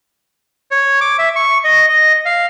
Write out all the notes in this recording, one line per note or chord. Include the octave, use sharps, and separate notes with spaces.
C#5
D6
E5
C#6
D#5
D#5
F5